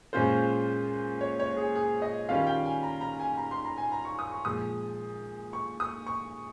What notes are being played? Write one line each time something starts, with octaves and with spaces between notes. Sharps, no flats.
A#2 G#3 C#4 F4 C5
C#5
C#5
G#4
G#4
D#5
D#3 G3 C#4 F4 F5
G5
G#5
A#5
A#5
G#5
A#5
C6
A#5
G#5
A#5
C#6
D#6
C#6
A#2 F3 G#3 D#6
C#6
D#6
C#6